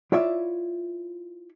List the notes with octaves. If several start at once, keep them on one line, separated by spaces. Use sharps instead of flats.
E4 F4 C#5 D5 E5